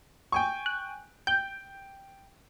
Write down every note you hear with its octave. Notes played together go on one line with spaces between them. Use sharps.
G5 G#5 C#6
F#6
G5 G6